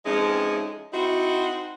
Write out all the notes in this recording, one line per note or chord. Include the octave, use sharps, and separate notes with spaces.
F2 E3 G#3 C#4 D#4
C4 D#4 E4 F#4